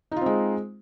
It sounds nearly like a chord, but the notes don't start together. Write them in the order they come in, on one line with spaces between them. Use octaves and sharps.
D#4 F4 C4 G#3